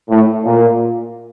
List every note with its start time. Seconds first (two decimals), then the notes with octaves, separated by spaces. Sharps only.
0.09 A2
0.45 A#2